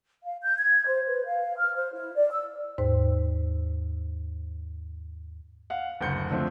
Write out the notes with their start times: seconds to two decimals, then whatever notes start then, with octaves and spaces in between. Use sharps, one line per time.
0.23 F5
0.42 G6
0.58 G#6
0.86 C5
1.07 B4
1.26 F5
1.57 F6
1.75 C5
1.93 E4
2.15 D5
2.30 E6
2.78 D#2 G#2 C5
5.70 F5 F#5
6.01 F#1 D2 G6 C#7
6.30 D3 F3 A3 C4